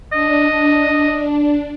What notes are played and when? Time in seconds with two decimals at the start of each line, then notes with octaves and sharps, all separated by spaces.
0.12 D4 D#5